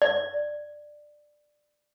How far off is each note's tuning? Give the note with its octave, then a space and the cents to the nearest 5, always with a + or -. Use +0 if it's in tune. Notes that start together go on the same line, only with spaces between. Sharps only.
D5 +10